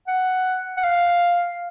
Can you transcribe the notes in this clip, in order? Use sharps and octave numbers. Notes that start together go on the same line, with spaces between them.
F#5
F#5
F5